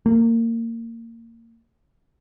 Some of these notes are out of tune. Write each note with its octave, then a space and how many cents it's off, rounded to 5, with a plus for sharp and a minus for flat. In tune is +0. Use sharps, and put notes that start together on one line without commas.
A#3 -25